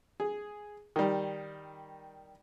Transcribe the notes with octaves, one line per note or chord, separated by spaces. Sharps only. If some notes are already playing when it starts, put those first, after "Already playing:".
G#4
D#3 G3